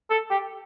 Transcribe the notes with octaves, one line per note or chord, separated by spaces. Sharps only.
A4
G4